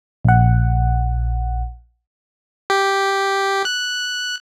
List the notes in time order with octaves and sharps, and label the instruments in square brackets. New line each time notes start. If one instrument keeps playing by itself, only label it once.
[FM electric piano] A#1 F#5
[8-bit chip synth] G4
F#6